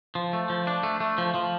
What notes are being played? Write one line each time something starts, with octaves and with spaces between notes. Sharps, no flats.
F3
A3
F3
D4
A3
A3
F3
F3